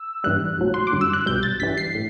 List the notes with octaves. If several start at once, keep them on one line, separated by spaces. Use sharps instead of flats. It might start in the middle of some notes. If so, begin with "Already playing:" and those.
Already playing: E6
G1 G2 E3 G3 F#6
B1 A2 F#3
C6
D6
F#2 D3 G3
E6
F#6
C2 B2 G3 G6
A6
G1 G2 E3 G3 B6
C7
A2